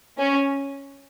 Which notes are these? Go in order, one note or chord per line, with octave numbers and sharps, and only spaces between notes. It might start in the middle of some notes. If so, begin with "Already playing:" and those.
C#4